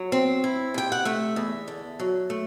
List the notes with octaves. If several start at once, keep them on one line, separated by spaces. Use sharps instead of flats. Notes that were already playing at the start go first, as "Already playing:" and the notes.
Already playing: F#3
C4
E4
C3 G5
F#5
A3 E5
E2
D3
F#3
A3